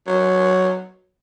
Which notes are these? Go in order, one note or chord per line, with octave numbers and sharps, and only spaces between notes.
F#3